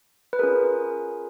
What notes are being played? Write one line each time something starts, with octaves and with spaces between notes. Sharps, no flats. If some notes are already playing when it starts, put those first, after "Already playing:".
B4
C#4 F4 G#4 A#4